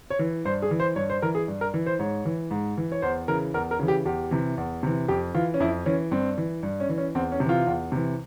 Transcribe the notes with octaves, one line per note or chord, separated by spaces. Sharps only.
C#5
E3
G2 C5
G#4
E3
C5
G2 C#5
C5
E3 A#4
G#4
G2
A#4
E3
C5
G#2 C#5
E3
G#2
E3
C#5
E2 C5
C#3 E3 A#4
E2 A#4
A#4
C#3 E3
G4
E2 G4
C3 E3
E2
C3 E3
F2 G4
E3 F4
C#4
F2 E4
E3 C#4
G2 C4
E3
G2
C#4
E3
C#4
E2 C4
C#4
C3
E3 F4
E2
C3 E3